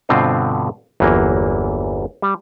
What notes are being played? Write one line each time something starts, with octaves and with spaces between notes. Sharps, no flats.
G2 B2 D3 C4 F4 C5
G1 E2 E3 F#3 A#3
G3